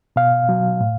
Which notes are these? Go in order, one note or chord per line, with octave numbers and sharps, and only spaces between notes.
B2 F5
F#3
A2